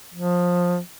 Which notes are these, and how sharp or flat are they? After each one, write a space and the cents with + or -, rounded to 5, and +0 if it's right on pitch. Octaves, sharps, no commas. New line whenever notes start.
F3 +20